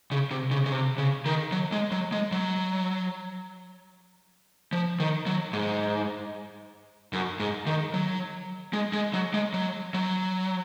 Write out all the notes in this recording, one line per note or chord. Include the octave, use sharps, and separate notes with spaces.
C#3
C3
C#3
C#3
C3
C#3
D#3
F#3
G#3
F#3
G#3
F#3
F3
D#3
F#3
G#2
F#2
G#2
D#3
F#3
G#3
G#3
F#3
G#3
F#3
F#3